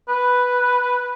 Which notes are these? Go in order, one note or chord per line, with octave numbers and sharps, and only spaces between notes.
B4